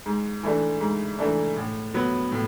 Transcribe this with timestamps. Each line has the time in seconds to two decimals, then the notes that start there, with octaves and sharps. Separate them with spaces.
0.06 G#2
0.43 E3 A3 D4
0.81 G#2
1.19 E3 A3 D4
1.56 A2
1.94 F#3 B3
2.32 A2